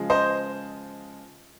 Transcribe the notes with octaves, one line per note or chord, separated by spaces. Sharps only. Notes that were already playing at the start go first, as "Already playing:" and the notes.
Already playing: C#3 F3 G#3
C5 D#5